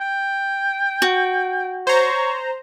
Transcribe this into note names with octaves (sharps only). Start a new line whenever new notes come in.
G5
F#4
C5 C#5 A#5